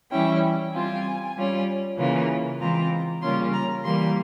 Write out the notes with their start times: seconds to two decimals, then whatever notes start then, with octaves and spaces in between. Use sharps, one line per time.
0.11 E3 G3 C#4 E4 G5
0.74 G3 C4 F4 G#5
1.36 G3 C#4 F4
1.98 C#3 E3 A#3 F4
2.59 E3 G#3 C4 F4 A#5
3.22 C#3 G3 A#3 C#4 F4 C6
3.52 A#5
3.83 E3 G3 A#3 C6